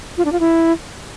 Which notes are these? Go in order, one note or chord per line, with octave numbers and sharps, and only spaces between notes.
F4
D4
F4
E4